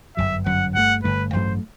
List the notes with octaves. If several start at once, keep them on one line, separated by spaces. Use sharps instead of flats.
G1 F#2 F#3 E5
G1 F#2 F#3 F#5
G1 G2 D3 A3 F#5
G1 G2 D3 A3 B4
A1 G2 F#3 A3 C5